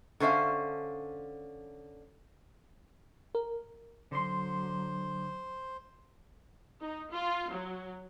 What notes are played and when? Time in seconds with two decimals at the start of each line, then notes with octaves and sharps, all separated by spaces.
0.20 D3 C#4 C5 E5 F5
3.35 A#4
4.11 D3 F#3 C5 C6
6.81 D#4
7.11 F4
7.51 F#3